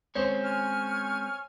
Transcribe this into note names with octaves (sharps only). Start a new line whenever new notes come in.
G#3 C4 C#4 C5 C#5
G#5 C#6 F6